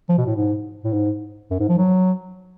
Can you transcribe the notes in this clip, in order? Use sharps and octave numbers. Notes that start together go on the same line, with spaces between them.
F3
B2
A2
G#2
A2
G#2
F#2
G#2
F3
F#3